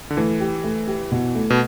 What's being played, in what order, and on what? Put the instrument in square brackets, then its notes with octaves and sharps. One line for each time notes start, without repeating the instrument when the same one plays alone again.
[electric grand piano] D3
[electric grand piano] E3 [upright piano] A3
[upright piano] G4
A3
G4
B2
A3
[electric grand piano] B2